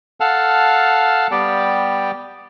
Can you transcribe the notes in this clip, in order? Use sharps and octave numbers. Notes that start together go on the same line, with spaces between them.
A4 F5 F#5 A5 F6
G3 B3 G4 D5 G5